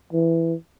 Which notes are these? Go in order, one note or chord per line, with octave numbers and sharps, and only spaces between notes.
E3